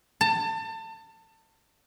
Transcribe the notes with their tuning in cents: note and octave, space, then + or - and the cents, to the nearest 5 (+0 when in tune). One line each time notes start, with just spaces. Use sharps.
A5 +30